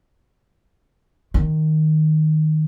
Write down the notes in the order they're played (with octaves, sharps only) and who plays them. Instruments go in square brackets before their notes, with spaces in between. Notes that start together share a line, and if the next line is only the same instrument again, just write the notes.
[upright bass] D#3